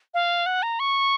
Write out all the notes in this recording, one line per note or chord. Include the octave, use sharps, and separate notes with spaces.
F5
F#5
A#5
C#6